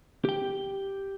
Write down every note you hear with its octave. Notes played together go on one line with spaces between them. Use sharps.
G4 G5